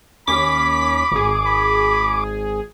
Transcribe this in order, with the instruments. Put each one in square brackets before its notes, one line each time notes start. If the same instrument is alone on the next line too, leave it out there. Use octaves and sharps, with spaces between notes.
[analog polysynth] D#2 C#4 B6 [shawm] B5 [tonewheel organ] D6
[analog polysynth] G#1 G#4
[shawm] B5